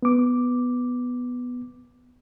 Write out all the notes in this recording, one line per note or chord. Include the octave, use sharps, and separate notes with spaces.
B3 D6